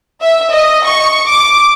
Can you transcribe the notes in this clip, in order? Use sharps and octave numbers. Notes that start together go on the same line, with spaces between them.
E5
D#5
C#6
D6